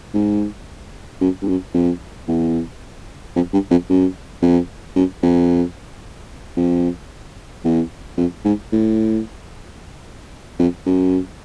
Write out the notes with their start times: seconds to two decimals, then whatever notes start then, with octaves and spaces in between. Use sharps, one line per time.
0.14 G#2
1.21 F#2
1.42 G2
1.48 F#2
1.74 F2
2.28 E2
3.36 F2
3.53 G2
3.70 F2
3.89 F#2
4.42 F2
4.96 F#2
5.23 F2
6.56 F2
7.65 E2
8.17 F2
8.45 G#2
8.72 A2
10.59 F2
10.86 F#2